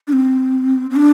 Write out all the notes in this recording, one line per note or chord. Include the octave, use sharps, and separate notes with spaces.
D4
C4
C4
D4